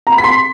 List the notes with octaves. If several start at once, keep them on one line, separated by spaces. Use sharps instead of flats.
A#5
B5
B6
C6